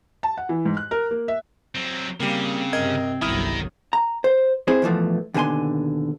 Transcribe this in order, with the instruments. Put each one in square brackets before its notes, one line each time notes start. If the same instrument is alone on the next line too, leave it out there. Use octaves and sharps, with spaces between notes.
[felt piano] A5
F#5
E3
G#2
F#6
A#4
A#3
E5
[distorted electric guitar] F#3 C4
[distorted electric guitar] C#3 [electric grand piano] G3 A#3 [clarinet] C4
[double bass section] G2 C3 [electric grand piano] A#4 D#5 G#6
[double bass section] G1 C2 F#3 [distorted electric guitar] D#3 [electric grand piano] E4 D#6 F6
[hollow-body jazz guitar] A#5
C5
C4 E4 G#4 C5
E2 B2 E3 F3 A3
D#2 B2 D3 G#5 C6